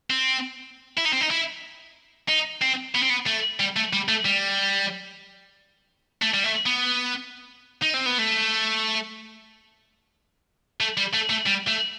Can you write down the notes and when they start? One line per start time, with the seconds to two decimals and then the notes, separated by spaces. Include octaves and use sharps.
0.10 C4
0.98 E4
1.06 D#4
1.13 C4
1.21 D#4
1.31 E4
2.28 D#4
2.61 C4
2.95 B3
3.02 C4
3.10 B3
3.26 A3
3.60 G3
3.76 A3
3.93 G3
4.08 A3
4.25 G3
6.22 A3
6.34 G3
6.44 A3
6.66 B3
7.82 D#4
7.94 C4
8.06 B3
8.19 A3
10.81 A3
10.97 G3
11.14 A3
11.30 A3
11.47 G3
11.68 A3